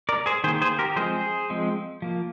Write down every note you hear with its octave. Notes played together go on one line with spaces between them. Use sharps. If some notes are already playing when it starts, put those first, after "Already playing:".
A#4 D5
G#4 C5
D#3 A#3 G#4 C5
G#4 C5
G4 A#4
F3 G#3 C4 G#4 C5
F3 G#3 C4
F3 A#3